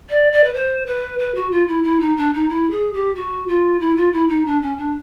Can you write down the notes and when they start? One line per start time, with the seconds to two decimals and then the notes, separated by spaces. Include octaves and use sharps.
0.10 D5
0.32 D5
0.44 B4
0.54 C5
0.86 B4
1.19 B4
1.35 F#4
1.51 F4
1.68 E4
1.84 E4
2.00 D#4
2.17 D4
2.34 D#4
2.49 E4
2.71 G#4
2.93 G4
3.15 F#4
3.48 F4
3.80 E4
3.97 F4
4.13 E4
4.29 D#4
4.46 D4
4.62 C#4
4.78 D4